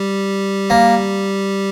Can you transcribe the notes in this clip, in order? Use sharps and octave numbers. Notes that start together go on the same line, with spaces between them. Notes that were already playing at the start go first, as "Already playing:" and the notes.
Already playing: G3 G4
A#3